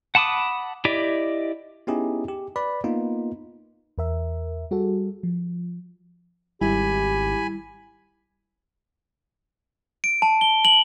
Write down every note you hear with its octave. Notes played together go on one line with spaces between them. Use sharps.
F#5 A5 B5 D6 D#6
E4 G4 D5 D#5
B3 C#4 D#4 E4 G4 G#4
G4
B4 D5 B5
A#3 B3 D#4 F4
E2 A#4 E5
G3 F#4 G#4 A4
F3
G#1 G3 E4 G4 G#5 B5
D7
A5
G7
F#7